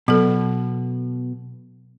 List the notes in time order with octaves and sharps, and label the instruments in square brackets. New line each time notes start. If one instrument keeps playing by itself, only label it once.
[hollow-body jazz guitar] B2 [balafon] F#3 A4